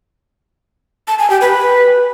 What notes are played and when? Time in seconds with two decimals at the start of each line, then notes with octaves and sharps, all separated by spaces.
1.08 A5
1.19 G#5
1.30 G4
1.41 B4